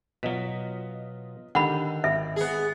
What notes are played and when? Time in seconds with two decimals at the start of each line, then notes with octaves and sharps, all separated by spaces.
0.23 B2 F#3 F4 D#5 B6
1.55 D3 D#3 G4 A4 F#5 B5
2.04 G#1 E5
2.36 B3 G#4